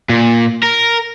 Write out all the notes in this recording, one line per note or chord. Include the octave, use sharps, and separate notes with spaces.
A#2
A#4